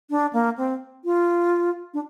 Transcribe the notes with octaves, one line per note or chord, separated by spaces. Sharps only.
D4
A#3
C4
F4
D4